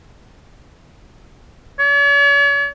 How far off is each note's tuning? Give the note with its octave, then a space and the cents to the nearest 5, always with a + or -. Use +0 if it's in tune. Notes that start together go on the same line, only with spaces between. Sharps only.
C#5 +45